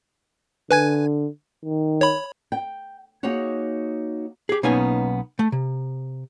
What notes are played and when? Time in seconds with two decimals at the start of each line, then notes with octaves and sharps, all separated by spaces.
0.71 D3 B4 G#5 G#6
1.65 D#3
2.01 C#5 B5
2.52 G5
3.23 A#3 D#4 F#4 G#4 C#5 F#5
4.49 G4 G#4
4.63 B1 A#3 B3 C#4 D#4 G#5
5.39 A3
5.52 C3